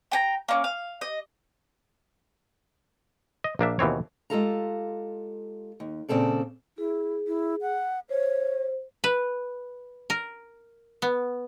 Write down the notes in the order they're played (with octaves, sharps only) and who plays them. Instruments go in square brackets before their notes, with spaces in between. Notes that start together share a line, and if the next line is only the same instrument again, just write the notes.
[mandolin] G5 G#5 A#5
A#3 C#4
F5
D#5
[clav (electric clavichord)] D#5
A#1 A#3 D4 E5
D#2 B2 E3 C4 C#5
[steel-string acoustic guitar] G#3 F4 G4 A4 F5 A#5
D#2
A#2 C#3 C4 A4 D5
[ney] E4 [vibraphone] G#4
[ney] E4
F#5
[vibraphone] C5 [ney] C#5
[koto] B4
A#4
B3